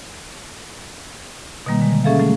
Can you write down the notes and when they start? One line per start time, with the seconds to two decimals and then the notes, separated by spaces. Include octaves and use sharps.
1.66 B2 D#3 G3 A#3
1.81 D3 G#3
2.04 A#3 C#4 G#4 A4 E5 F5
2.19 F#3 A3